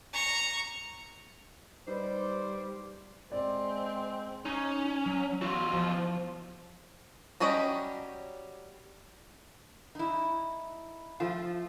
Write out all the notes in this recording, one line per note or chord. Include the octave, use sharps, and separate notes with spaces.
A#5 C#6
G3 D#4 B4 C5 D5
G#3 C4 D5
C#4 D#4
F#3
E2 F4 F#4
F3
F#3 G3 C#4 G4 D#5
D#4 E4
F3 A3 F4